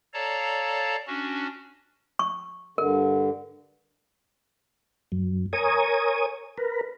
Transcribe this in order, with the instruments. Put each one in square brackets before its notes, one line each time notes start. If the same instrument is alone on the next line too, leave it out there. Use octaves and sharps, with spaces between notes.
[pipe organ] A4 C#5 D5 F5 A5 A#5
C#4 D4 F#4
[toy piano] C#6
[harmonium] G2 D3 [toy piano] A#4
[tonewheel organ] F#2
A#4 C#5 G#5 D#6
A#4 B4